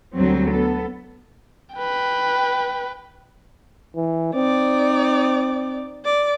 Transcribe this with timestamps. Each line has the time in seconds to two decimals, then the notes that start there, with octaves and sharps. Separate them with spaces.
0.16 D2 F#3 G3 C4
0.51 B3 A4
1.75 B4 G5
3.96 E3
4.35 C4 D#4 D5
6.05 D5